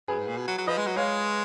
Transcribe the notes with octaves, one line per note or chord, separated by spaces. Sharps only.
F#2 G#4 B4
G#2
A#2
B2
F#3
F#3
F3 B4 D#5
G#3
F#3
G#3 C#5 F5